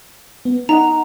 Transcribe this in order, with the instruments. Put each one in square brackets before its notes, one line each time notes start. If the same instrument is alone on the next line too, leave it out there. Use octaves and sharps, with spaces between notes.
[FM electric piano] B3
[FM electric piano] D#4 D#5 F#5 [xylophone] A#5